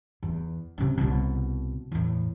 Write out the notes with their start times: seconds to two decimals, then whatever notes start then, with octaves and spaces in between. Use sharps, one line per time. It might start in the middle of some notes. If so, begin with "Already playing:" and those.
0.23 E2
0.78 C3 C#4
0.98 C2 B2
1.92 E2 A2